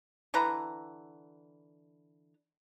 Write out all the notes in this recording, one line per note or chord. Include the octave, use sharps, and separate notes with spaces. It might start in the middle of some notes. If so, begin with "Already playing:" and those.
D3 E3 B4 A#5